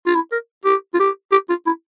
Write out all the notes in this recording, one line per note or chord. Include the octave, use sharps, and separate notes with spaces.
F4
E4
A#4
G4
F4
G4
G4
F4
E4